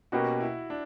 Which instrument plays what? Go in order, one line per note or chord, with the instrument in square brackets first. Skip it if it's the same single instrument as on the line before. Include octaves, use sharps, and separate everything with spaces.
[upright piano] B2 A#3 C#4 G4 B4 [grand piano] F#4
[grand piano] E4
D4